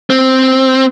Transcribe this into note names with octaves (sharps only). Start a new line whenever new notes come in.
C4